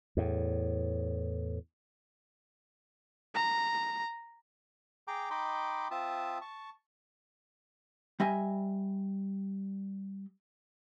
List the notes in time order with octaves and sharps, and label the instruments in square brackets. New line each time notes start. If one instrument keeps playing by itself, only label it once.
[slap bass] E2 A2
[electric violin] A#5
[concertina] G#4 G5 A#5 D6
D#4 D#5 G5 B5 C6 D6
C4 F4 E5 A5 D#6
A5 C#6
[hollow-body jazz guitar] G3 D#5 E5 G#5